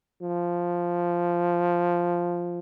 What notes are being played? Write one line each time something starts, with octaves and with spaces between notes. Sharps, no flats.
F3